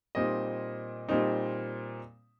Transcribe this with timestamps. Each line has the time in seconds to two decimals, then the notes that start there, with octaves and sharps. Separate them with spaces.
0.15 A#2 G3 C4 D#4 D#5
1.09 A#2 G3 C4 D#4